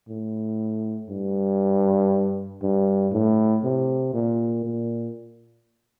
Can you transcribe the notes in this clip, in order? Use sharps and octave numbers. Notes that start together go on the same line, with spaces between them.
A2
G2
G2
A2
C3
A#2
A#2